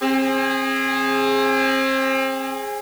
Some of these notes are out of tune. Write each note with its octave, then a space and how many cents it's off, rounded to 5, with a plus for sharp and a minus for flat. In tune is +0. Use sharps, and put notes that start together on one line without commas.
C4 +30 G#4 -10